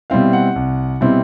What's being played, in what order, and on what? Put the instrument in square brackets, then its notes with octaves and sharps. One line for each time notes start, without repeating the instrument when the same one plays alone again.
[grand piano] B2 G3 C4 E4 F5
F#5
C2
B2 G3 C4 E4